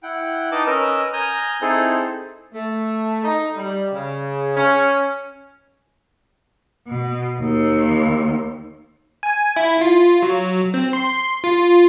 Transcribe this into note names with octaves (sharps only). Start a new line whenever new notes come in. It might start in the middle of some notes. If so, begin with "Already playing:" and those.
E4 F#5 G5
D#4 B4 D#5 A5 D6
C#4 A#4 B4 D#5 E6
G#5 A#5 D#6 F6 G6
C4 D#4 E4 G#4 A4 C5
A3
D#4
G3
C#3
C#4
B2
D#2
G#5
E4
F4
F#3
C4
C6
F4